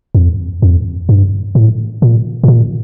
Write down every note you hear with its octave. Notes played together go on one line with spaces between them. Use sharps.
F2
F2
G2
A2
A#2
A2
A#2